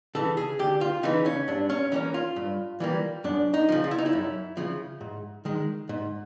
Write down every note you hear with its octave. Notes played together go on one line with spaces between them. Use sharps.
C#3 E3 A4
G#4
D2 G4
F4
C#3 E3 D#4
C#4
G2 D4
C#4
E3 G3 A#3 C#4
F4
G2
E3 G3 A#3
F#2 D4
D#4
C#3 F3
F4
E4
D#4
E4
F#2
C#3 F3
G#2
D#3 G#3
G#2